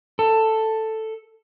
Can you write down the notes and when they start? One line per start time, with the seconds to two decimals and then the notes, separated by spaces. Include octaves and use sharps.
0.19 A4